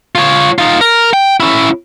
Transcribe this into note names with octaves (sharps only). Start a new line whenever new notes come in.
F4 C#5
D#4 F4
A#4
G5
C#4 E4